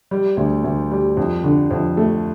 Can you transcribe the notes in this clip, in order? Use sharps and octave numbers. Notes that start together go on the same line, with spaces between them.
G3
D2
D2
G3
F2
D3
F2
A3